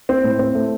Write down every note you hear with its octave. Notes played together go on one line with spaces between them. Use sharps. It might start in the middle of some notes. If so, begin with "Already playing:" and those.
C4
A2
C4
A3